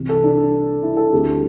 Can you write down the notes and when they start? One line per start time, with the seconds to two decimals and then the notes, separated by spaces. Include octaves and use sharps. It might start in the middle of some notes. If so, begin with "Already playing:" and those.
Already playing: C2 C3 E3 G3
0.09 A4
0.24 D4
0.83 E4
0.97 A4
1.13 D2 D3 G3 C4